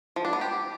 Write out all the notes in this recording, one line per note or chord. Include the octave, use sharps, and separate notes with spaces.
F3
D4
B3
G4